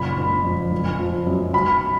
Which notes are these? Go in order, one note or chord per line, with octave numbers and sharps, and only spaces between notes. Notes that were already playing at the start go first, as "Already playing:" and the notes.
Already playing: F#1 A#2 B5
F#1
F2
F#1
F3
F#2
B1 B5